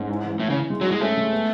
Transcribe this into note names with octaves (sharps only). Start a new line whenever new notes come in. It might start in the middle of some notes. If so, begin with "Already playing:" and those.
Already playing: G#2 C#4
E4
E3
A2 E3
C#3
E3
G#3
F#3
E4
G#3
A3 C#4
G#3
B3